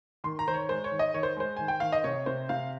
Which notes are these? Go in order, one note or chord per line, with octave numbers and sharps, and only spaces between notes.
D#3 C6
A#5
D#3 C5
C#5
G#3 C5
C#5
D#3
D#5
D#3 C#5
C5
G#3 C5
D#3 G#5
G5
D#3 F5
D#5
C3 C#5
C3 C5
C3 F5